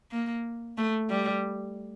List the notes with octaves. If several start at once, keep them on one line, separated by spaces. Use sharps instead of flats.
A#3
A3
G3